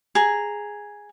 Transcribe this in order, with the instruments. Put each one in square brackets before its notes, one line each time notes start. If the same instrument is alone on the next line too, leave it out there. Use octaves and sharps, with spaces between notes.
[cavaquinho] G#4 A#5